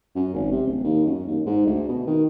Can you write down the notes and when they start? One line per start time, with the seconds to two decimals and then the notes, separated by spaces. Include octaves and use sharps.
0.16 F#2
0.34 G#1
0.51 C3
0.67 D1
0.84 D#2
1.07 F#2
1.27 D#2
1.46 G#2
1.66 D2
1.89 B2
2.07 D#3